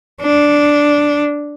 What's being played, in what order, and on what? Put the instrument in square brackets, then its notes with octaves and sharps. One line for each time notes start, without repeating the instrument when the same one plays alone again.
[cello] D4